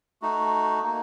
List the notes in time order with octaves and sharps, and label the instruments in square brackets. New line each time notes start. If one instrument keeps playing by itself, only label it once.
[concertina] A3 D#4 F#4
A#3 D#4 F#4